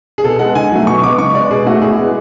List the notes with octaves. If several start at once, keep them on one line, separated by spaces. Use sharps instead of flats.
G#4
B2 A4
G#3 B3 F#5
D3 G#5
F#3 A3
B2 C#6
G#3 B3 D6
C#3 C#6
G#3 B3 D5
B2 G#4
A3 F#4
A2 G#4
G#3 B3